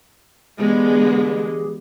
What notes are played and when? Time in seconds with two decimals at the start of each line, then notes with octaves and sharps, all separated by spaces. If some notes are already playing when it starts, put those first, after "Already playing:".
0.60 D3 E3 G#3 B3 G4 G#4